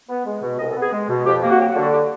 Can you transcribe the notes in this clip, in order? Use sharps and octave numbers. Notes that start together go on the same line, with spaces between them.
B3
G#3
B2
C2 D#5
A4
B3
G#4
G#3
B2
F2 G4
A#3
F#4
F#3 G4
F#4
D3
F#4
G4